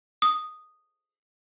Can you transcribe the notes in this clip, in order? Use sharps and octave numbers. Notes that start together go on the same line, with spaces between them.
D#6